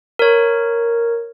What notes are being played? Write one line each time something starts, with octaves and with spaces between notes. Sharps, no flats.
A#4 C#5